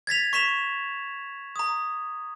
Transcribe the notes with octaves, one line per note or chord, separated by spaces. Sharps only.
G#6 A6 B6 F7
C#6 B6 E7 F7
A#5 D#6